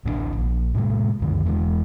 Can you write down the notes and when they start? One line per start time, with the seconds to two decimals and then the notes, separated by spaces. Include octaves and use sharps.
0.05 D1 A1 C4 D4
0.37 A#1
0.74 A2 C3 G3 G#3
1.21 C#2 F#2 D3 D#3
1.45 E2 E3 F3 G#3